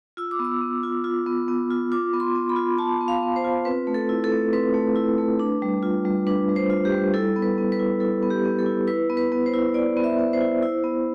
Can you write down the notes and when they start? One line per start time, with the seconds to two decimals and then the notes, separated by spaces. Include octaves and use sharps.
0.17 F4 E6
0.31 D6
0.39 B3
0.45 E6
0.61 B3
0.83 F4
1.04 F4
1.26 B3
1.48 B3
1.70 F4
1.92 F4 D6
2.13 B3
2.20 C6
2.35 B3
2.49 B5
2.56 F4
2.78 F4 A5
3.01 B3
3.08 F5
3.22 B3
3.36 C5
3.44 F4
3.65 C4 B4
3.87 A3
3.94 A4
4.09 E4
4.24 A4
4.32 A3
4.53 C4 B4
4.74 A3
4.96 E4
5.18 A3
5.39 D4
5.62 G3
5.83 F4
6.05 G3
6.27 D4 B4
6.49 G3
6.56 C5
6.70 F4
6.85 G4
6.92 G3
7.14 E4 A4
7.36 B3
7.42 B4
7.58 B3
7.72 B4
7.79 E4
8.00 E4 A4
8.23 B3
8.30 G4
8.45 B3
8.59 A4
8.66 E4
8.87 E4 B4
9.10 B3
9.17 B4
9.32 B3
9.46 C5
9.54 E4
9.74 E4 D5
9.97 B3
10.04 E5
10.18 B3
10.33 C5
10.41 E4
10.63 E4
10.84 B3